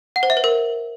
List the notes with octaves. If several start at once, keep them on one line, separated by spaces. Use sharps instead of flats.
F#5
C5
E5
B4
A#4